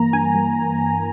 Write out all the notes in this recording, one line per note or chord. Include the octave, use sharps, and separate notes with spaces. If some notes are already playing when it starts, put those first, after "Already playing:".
Already playing: G2 E3 A#3 A#5
G2 G#5
G2